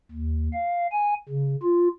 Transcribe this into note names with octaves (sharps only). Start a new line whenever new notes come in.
D#2
F5
G#5
C#3
F4